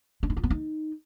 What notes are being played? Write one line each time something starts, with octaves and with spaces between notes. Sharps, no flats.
D4
D#4
F4
B3
D#4